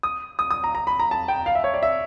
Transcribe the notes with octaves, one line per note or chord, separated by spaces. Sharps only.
D#6
D#6
D#6
A#5
A#5
B5
A#5
A5
G5
F5
E5
C#5
D5
E5